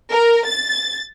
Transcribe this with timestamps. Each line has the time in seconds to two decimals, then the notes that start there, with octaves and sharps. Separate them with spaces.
0.11 A#4
0.46 A6